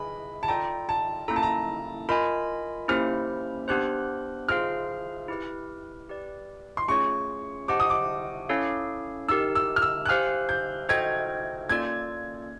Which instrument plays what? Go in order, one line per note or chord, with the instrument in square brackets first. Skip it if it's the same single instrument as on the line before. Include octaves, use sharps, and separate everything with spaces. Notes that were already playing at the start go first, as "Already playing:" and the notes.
Already playing: [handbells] G#4 B4 D#5 G#5 [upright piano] B5
[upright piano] A5
[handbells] F4 A4 D5 G5 [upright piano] A#5
[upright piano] A5
[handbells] A#3 C#4 E4 A4 [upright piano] A#5
[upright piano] A5
A#5
[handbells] F4 A#4 D#5 G#5 [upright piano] B5
[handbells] A#3 C#4 E4 G4 C5 [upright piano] F6
[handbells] B3 D4 G4 C5 [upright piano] F#6
[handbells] F4 G#4 C5 F5 [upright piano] F6
[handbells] E4 G4 B4
G4 B4 D5
[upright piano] C6
[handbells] A3 C#4 F4 G#4 C#5 [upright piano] C#6
[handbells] G4 C5 D#5 F#5 A5 [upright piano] D6
[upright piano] D#6
D6
[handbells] C#4 E4 A4 C#5 F5
[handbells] D#4 G4 A#4 [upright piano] E6
[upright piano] E6
F6
E6
F#6
[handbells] G4 C5 F5 G#5 [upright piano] F6
[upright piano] G6
[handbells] F#4 A4 C5 D#5 G5 [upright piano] G#6
[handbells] A#3 C#4 F4 A4 D5 [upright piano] G#6